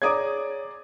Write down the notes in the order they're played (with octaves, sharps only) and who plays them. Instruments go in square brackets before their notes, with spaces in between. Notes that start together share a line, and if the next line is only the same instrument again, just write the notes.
[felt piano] G#4 D5 A#5 [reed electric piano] C#5 [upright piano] D6 D#6 G#6